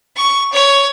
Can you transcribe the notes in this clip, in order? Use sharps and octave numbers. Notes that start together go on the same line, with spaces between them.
C#6
C#5